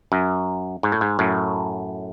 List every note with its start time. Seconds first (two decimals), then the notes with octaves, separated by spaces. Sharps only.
0.12 F#2
0.83 G#2
0.92 A2
1.01 G#2
1.19 F#2 A2